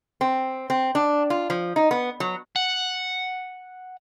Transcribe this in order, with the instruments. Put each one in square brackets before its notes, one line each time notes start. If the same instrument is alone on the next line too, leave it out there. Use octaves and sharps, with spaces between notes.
[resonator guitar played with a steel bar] C4
C4
D4
F4
F3
D#4
B3
F#3
[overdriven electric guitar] F#5